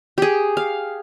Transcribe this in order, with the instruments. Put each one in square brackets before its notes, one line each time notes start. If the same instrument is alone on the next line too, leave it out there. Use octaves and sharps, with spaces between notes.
[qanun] G4 G#4
F5